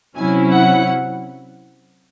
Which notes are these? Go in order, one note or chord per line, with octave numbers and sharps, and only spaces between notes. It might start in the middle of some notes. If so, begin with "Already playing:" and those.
C3 F#3 C#4 E4 G#5
F#5